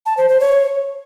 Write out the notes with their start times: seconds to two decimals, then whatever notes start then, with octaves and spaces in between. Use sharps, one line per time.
0.06 A5
0.17 C5
0.29 C5
0.40 C#5